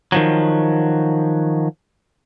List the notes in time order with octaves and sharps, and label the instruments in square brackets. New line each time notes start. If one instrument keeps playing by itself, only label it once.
[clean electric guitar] D#3 F3 F#3